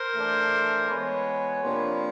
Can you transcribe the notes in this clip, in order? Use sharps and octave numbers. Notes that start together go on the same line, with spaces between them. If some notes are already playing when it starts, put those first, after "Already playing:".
Already playing: A#4 C5
E3 A3 D4
E3 G#3 B3 B4 C#5
C3 F3 A#3 D4